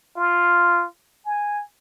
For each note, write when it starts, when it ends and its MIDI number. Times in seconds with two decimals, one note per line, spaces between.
0.17 0.85 65
1.26 1.62 80